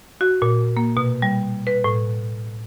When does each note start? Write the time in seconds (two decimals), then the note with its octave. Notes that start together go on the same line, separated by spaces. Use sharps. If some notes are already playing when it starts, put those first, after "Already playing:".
0.21 F#4
0.42 A#2
0.77 A#3
0.97 B2
1.22 G3
1.67 B4
1.84 A2